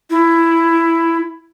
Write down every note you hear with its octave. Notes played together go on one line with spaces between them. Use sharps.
E4